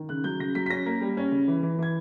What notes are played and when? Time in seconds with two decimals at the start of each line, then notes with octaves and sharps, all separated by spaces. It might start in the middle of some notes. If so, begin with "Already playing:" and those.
Already playing: D#3
0.09 C#3 F#6
0.24 F#3 G6
0.40 C#3 A#6
0.55 F#3 B6
0.66 B6
0.70 C#4 A#6
0.86 A#3
1.01 G3
1.17 C#4
1.32 C#3
1.48 E3
1.63 E3
1.78 E3 G#6